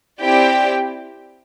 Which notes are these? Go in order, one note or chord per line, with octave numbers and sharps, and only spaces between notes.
C4 E4 G4 D5 G5